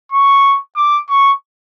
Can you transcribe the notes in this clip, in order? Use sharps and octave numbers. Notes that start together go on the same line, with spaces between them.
C#6
D6
C#6